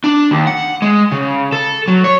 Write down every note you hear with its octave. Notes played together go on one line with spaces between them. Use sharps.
D4
D#2
F#5
G#3
C#3
A4
F#3
C#5